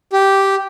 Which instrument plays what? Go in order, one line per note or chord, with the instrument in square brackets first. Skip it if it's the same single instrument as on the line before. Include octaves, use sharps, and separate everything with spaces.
[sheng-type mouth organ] G4